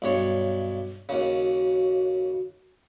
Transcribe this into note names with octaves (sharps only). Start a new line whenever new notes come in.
B1 G2 C#5
D#2 C#3 F#4